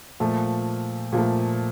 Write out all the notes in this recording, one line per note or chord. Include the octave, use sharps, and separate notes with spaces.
A#2 F3 A3
A#2 F3 A3